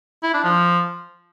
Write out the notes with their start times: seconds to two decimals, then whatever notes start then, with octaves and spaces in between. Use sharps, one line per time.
0.23 E4
0.34 D4
0.44 F3